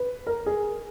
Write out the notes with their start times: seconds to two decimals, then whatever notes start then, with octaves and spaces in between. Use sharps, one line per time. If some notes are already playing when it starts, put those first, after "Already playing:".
Already playing: B4
0.27 A#4
0.46 G#4